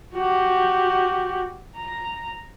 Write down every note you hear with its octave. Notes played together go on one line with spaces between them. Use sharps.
F#4 G4
A#5